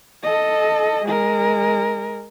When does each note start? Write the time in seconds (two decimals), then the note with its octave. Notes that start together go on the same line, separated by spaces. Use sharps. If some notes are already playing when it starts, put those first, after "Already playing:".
0.23 A4 D#5
1.04 G#3 A#4